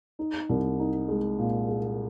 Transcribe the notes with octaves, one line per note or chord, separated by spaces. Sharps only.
D#4
C2
D#4
G#3
A#2
G#3